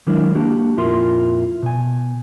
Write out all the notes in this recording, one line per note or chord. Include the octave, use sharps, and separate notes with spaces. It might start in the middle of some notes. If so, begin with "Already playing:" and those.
D#3 F#3 G#3 D4 E4 A#4
A#3 D4 F#4 G4
F2 A#2 E4 F4 A#4 C6
B2 G#5